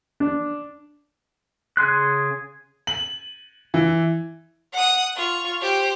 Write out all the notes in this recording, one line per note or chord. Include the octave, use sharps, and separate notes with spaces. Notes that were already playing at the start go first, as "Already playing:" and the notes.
D4
C#3 G#4 C6 F#6
F#7
E3
F#5 D#6
F4 C#6
G4 C5